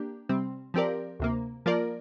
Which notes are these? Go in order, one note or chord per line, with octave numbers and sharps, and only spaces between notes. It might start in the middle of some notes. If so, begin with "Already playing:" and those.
Already playing: A#3 D4 G4
C3 G3 C4
F3 C4 G4 A#4 D5
D2 C3 A#3
F3 A#3 F4 A#4 D5